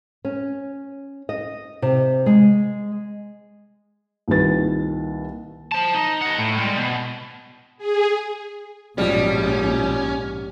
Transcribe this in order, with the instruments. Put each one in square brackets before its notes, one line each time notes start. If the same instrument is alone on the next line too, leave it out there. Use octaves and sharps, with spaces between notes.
[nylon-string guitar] C#4
D#5
C3
G#3
[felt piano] C2 A#2 D#3 B4 A6
[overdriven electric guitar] C5 A5
D#4
D#5 F#5
A2
G3 G#3
B2
[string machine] G#4
[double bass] A#1 G#2 [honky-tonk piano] B2 F3 G#3 [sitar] G3 [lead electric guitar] C#4